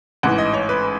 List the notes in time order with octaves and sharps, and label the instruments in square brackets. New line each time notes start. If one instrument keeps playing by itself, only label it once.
[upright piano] A1 G#2 E3 F#5
D#5
C#5
B4